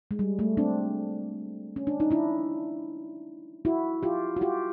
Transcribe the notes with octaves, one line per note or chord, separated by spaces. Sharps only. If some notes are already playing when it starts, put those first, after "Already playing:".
G#3
G3
A3
C4 D4
C#4
D4
D#4
D4 E4
E4 F#4
F4 G4
F#4
F4 G4